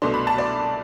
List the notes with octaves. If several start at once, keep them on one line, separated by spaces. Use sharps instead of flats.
C2 B2 A3 D4 C6
B5
A5
D5